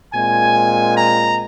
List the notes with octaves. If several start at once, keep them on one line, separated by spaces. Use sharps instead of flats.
A#2 G#3 C4 G#5
A#5